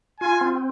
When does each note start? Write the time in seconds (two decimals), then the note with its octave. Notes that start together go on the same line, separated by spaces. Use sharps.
0.20 F4 G#5
0.41 C4